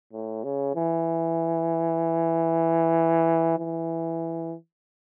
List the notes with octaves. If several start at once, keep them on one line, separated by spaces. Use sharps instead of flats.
A2
C#3
E3
E3